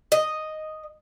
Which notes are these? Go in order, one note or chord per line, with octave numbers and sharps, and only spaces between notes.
D#5